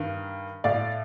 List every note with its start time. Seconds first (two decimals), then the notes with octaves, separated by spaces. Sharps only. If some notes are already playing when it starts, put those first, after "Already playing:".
Already playing: G2 D#3
0.64 A2 D5 F5